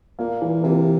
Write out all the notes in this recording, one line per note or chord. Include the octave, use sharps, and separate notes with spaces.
A#2 A#3
E3
C3 E3